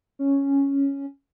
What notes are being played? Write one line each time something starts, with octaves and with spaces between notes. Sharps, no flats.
C#4